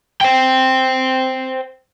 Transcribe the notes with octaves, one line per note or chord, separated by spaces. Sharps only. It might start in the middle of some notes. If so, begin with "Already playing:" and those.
C5 G5